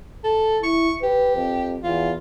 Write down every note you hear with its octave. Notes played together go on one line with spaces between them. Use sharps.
A4
E4 C#6
G4 B4
F2
E2 F4